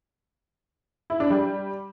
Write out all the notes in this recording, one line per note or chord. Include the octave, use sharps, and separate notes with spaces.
E4
D4
G3